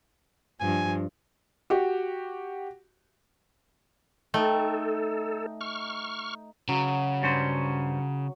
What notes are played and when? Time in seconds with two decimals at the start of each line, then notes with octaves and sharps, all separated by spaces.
0.60 G2 F3 G#5
1.70 F#4 G4
4.34 A3 D#4 A4 G5
5.61 C#6 F6
6.68 C#3 F#3
7.23 G2 C#4 C5